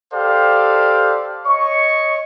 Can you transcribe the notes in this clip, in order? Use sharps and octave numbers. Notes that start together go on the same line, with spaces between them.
G4 A4 C5 D5 F5
C#5 D#5 C#6